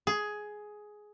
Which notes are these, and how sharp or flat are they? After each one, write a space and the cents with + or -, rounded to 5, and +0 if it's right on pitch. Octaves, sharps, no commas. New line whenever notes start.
G#4 +10